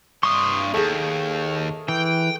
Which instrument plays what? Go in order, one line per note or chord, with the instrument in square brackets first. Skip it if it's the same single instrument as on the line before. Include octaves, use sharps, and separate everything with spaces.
[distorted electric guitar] G2 C6 [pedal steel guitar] C#6 D#6
[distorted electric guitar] D#2 [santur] A3 G#4
[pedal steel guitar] E3 [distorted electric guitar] G5